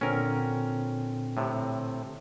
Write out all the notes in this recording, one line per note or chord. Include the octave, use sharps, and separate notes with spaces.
A#2 D3 C4 C#4 A#4
A2 C3